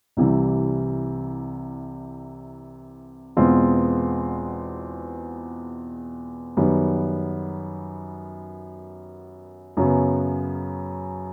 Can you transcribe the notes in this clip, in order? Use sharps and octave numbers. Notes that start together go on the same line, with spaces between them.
C2 C3 E3 G3
E2 B2 G#3 C4 F4
F#2 D#3 G3 B3
F#2 C#3 F#3 B3